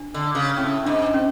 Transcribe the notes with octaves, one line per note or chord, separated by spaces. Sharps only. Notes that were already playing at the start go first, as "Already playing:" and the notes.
Already playing: D4
D3
C#3
A2 C#4
G#2 D4
C#4